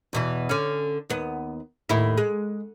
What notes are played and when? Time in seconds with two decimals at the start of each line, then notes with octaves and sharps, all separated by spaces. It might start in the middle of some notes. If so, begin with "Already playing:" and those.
0.13 E2 B2 E3
0.49 D3 C#4
1.10 D#2 B3
1.89 D#2 A2 E4
2.17 G#3